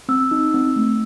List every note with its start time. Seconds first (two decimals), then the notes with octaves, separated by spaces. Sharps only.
0.09 C4 E6
0.31 D#4
0.54 C4
0.76 A3